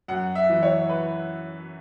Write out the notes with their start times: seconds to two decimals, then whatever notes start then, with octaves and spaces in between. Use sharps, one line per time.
0.08 F#2 F#5
0.35 E5
0.49 E3
0.63 C#5
0.89 B4